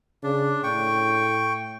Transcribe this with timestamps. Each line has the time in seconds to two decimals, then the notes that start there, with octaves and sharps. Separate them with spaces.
0.24 C#3 D4
0.63 A2 G5 C#6